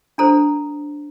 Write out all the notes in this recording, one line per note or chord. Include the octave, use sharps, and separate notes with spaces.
D4 A4 C5 A#5